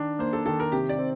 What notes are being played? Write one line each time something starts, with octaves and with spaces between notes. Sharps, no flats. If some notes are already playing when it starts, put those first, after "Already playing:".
Already playing: D#3 D4
A#3 C5
A4
D#3 A4
A#4
C3 G4
D5
C4